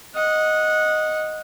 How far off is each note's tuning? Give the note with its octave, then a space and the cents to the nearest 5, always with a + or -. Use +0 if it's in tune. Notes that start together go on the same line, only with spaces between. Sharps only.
D#5 +0 F#5 -15